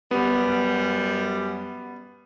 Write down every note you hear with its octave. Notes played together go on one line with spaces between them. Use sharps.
F#2 G3 B3